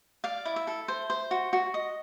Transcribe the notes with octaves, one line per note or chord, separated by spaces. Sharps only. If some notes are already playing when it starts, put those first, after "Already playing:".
D5 F5
E4
E5
A4
C5
C5
F#4
F#4
D#5